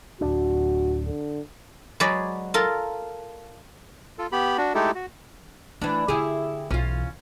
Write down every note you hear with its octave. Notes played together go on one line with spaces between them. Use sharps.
D1 D4 F#4
D3
F#3 G#3 G#4 B4 C#5 D5
F4 A4 A#4
F4 A4
B3 G4 B5
D4 F#4
G#3 A3 D#4 E4 G4 A4
F#4
E3 A3 D4
D3 E4 G4 G#4
B1 E3 C#4 F4